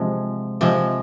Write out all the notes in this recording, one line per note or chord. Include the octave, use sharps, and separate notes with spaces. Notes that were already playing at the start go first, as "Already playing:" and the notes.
Already playing: C3 F3 G#3
C3 F3 G#3